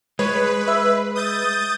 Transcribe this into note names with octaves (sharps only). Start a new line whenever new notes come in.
G#3 B4 C#5
E5
D#6 G6 A6